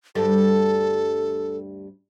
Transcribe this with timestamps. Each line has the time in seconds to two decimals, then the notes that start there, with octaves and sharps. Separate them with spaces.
0.15 D2 G2 G3 A4